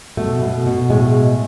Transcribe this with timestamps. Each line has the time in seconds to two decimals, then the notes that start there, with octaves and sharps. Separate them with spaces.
0.17 B2 A3
0.42 B2
0.66 B2
0.90 A2 G#3